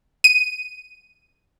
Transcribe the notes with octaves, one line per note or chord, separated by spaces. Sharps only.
D#7